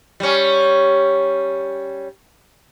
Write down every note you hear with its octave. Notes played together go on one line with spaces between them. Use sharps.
G3 C#4